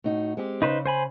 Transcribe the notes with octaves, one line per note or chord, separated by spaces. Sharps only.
A2 D#4 F#4
G#3 C4 G4
C#3 D#4 B4 C5
C5 G#5 B5